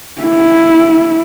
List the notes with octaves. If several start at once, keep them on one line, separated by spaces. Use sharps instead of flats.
E4